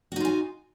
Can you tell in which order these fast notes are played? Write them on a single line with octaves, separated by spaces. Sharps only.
F#4 D#4 F4 G#5